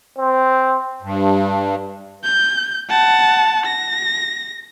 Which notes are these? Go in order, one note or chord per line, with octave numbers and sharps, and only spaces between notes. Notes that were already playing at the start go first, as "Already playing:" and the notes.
C4
G2
G6
F#5 A5
A#6